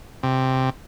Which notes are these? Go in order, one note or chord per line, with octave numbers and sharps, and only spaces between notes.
C3